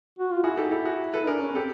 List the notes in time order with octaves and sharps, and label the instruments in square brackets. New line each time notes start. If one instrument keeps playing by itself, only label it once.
[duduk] F#4
F4
[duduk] E4 [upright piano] F#4 G#4
[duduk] D#4 [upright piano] G4 A4
[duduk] E4 [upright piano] G4 A4
[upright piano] F#4 G#4
A4 B4
[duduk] D4 [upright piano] G#4 A#4
[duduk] C#4
[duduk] C4 [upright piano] G4 A4